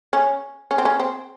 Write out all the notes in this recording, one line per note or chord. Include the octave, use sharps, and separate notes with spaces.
C#4
C#4
C4
C#4
C4